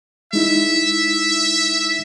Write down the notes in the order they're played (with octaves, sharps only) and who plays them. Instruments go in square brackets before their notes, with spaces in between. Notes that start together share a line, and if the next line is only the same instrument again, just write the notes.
[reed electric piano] G#3 D#4 E4 [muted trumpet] E5